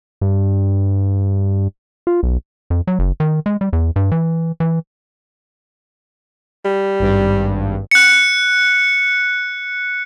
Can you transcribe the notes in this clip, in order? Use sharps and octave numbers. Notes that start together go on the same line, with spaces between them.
G2
F4
B1
F2
F#3
F#1
D#3
G#3
G3
E2
G2
E3
E3
G3
G#1 G2
F#6 C#7